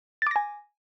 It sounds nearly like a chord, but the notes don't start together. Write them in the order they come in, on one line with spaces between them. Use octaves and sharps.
A6 D6 A#6 G#5